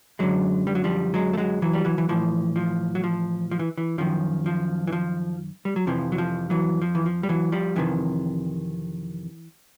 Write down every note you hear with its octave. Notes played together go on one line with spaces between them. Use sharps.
F#2 D3 F#3 G#3
G3
F#3
F3 G3
F#3 G#3
A3
F#3 G#3
E3 F#3
G3
E3 F#3
E3
A2 E3 F3
F3
F#3
F3
F3
E3
E3
F#2 D#3 F3
F3
E3
F3
G3
F#3
F2 C3 E3 F3
F#3
F3
E3 F#3
F3
E3
F3
G3
E3 F#3
F3 G3
F2 C3 D#3 E3 F#3